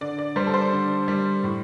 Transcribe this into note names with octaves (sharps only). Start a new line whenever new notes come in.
D3 D5
D5
G3 C5
A4
C5
D3
G3
A2